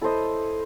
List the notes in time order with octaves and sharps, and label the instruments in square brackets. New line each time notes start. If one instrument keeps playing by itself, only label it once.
[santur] E4 A4 C5 D#5